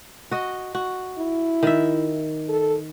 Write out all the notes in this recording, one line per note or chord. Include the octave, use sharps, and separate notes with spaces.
F#4 D#5
F#4
E4
D#3 E5
A4